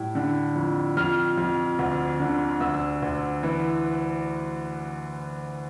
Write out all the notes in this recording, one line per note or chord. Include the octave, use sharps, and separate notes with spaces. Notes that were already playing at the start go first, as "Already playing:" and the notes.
Already playing: A2 G3
D3
F2
F2 F6
F2
D2
D3
D2 E6
D2
E3